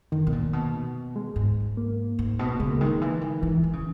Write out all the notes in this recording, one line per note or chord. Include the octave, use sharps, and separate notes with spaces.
F#2 D#3
B2
A#2
B2
G#3
G#2
A#3
G#2
B2
C#3 G#3
A#3
D#3 G#3
E3
D#3
D#3 E3
D#3
C#3